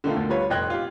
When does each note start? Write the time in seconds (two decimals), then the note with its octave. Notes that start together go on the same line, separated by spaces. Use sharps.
0.04 D3 D#3 A3 F4
0.17 D2
0.30 G3 F4 B4 C#5
0.50 F1 D#5 G5 C6 F#6 G#6
0.70 F4 G4